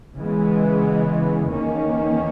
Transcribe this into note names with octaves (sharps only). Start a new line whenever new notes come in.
C#3 E3 G#3 B3
E2 D#3 A#3 C#4